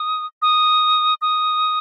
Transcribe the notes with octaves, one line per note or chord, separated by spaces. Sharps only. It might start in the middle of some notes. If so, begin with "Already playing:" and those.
Already playing: D#6
D#6
D#6